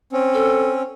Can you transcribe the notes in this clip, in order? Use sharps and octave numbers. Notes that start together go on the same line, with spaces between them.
C4 C#4
A4